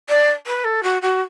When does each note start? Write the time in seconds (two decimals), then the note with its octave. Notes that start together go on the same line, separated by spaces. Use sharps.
0.10 D5
0.47 B4
0.65 A4
0.83 F#4
1.02 F#4